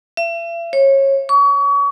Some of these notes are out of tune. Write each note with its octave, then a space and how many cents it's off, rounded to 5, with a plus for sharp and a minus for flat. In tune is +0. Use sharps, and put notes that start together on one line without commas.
E5 +40
C#5 -25
C#6 +35